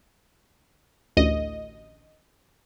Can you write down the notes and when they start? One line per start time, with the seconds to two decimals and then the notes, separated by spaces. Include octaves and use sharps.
1.17 A1 D2 D#5